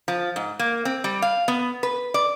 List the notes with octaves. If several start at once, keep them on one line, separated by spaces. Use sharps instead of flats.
F3
G#2
A#3
C4
G3
F5
B3
B4
D5